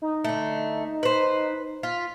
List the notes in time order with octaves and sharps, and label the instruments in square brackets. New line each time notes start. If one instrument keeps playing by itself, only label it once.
[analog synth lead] D#4
[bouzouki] D3 A3
B4 C5
[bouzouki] F4 [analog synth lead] B6